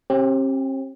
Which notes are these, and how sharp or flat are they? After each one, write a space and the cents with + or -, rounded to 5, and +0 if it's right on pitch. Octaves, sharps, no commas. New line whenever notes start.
C4 +45 G4 -5